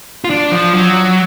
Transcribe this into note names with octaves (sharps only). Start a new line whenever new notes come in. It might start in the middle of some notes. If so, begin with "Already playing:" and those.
F4
D4
F3
F#3